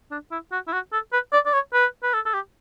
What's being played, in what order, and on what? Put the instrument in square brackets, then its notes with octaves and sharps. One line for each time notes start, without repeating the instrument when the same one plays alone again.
[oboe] D4
E4
F#4
E4
F#4
A4
B4
D5
D5
C#5
B4
B4
A4
A4
G4